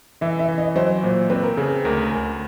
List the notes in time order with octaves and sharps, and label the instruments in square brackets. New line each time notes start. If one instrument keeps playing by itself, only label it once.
[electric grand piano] E3 [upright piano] E5
[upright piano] E5
[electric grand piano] E3
[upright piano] D#5
[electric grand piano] F#3 [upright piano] C5
[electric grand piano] A#2
[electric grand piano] C4 [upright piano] B4
[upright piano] A#4
[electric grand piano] C#3 [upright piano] G#4
[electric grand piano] D2 [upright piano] A#4
[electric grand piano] D2